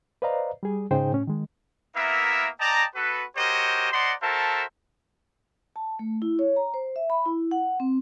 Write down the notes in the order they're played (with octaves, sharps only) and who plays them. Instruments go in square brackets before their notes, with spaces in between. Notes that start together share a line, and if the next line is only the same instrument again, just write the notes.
[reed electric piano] B4 C5 D5 D#5 F5 A#5
G3 G#4
G#2 C#3 D#4 G#4 C5 G5
A2 C#4
D#3 G#3
[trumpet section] A#3 B3 E4 A#4 E5
D5 D#5 G5 A5 A#5
B3 F#4 A4 B4
F#4 G4 A#4 C5 C#5 D#5
C5 D5 D#5 F#5 A#5 C6
F#4 A4 A#4 C5 E5 A5
[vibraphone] A5
A3
E4
C#5
A#5
C5
E5
B5
E4
F#5
C4